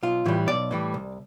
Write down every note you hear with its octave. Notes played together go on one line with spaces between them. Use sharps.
B1 F4
A2 E3 G3
B1 D5
A2 E3 G3
C2